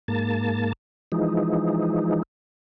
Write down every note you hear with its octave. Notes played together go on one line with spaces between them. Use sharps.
G#2 A#3 A5
E3 F3 G#3 D#4